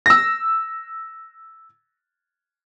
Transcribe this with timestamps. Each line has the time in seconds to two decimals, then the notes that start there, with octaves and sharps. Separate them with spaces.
0.06 E6 A#6